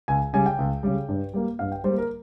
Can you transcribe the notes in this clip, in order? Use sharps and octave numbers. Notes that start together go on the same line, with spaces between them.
C#2 G#5
C#3 G3 G#5
G5
C#2
C#3 G3
G2
G3 A#3
G2 F5
G5
G3 C5
A#3
A#4